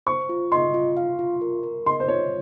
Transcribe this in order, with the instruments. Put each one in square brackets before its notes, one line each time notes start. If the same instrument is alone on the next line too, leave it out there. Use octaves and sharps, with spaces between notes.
[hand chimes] C5 [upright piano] C#6
[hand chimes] F4
[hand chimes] D#5 [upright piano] C6
[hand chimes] F4
F5
F4
A#4
A#4
[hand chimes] D#5 [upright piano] C6
[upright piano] C5
[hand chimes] F4 [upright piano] C#5